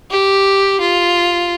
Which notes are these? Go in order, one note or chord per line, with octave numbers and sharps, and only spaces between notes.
G4
F4